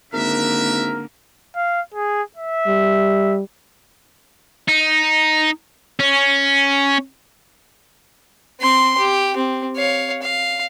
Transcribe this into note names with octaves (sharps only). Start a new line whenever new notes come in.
G#1 D3 A#3 A#4 B4 E5
F5
G#4
E5
G3
D#4
C#4
C4 C6
G4
C4
C#5 F5
F5